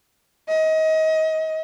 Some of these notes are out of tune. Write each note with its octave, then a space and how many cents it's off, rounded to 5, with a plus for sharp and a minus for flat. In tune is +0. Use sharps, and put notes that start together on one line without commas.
D#5 +30